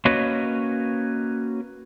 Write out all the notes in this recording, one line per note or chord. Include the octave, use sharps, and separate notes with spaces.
A#3 C#4 F#4 B4 C#5 D#5